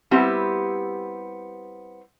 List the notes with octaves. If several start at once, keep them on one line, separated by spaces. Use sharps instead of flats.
G3 B3 C4 E4 G4